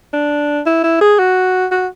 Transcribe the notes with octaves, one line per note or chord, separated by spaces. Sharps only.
D4
E4
E4
G#4
F#4
F#4